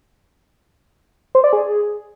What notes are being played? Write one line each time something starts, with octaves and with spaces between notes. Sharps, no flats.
C5
D5
G#4